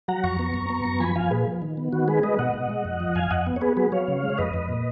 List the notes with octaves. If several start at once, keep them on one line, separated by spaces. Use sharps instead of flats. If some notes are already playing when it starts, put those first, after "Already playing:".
F#3 F#5 A#5
F2 A#5 C#6
B3
F#2
B3
F#2
F3 G#5 B5
F3 F5 G#5
A#2 G#4 B4
F3
D#3
B3
D#3 F#4
G#3 G#4 B4
G#3 B4 D#5
B2 D#5 F#5
B2
G#3
F2
F3
F2 F5 G#5
F2 D#5 F#5
B3
C#5
B3 G#4 B4
F#3 G#4 B4
F#3 C#5 F5
C#3
G#3
C#5
F2 B4 D#5
F2
A#2